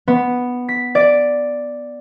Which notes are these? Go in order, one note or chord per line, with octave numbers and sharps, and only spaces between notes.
B3
B6
D5